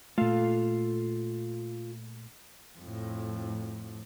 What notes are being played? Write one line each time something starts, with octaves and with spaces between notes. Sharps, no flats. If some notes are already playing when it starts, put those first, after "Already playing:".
A#2 A3 F4 A4 F5
F2 A2